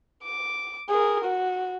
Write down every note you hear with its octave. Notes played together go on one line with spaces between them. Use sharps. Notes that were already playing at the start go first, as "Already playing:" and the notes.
D6
G#4 A#4
F#4